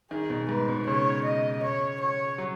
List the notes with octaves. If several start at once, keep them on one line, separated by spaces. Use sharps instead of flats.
D#3 G#4
B2
G#2 B4
B2
C#3 C#5
D#5
C#5
C#5
F#3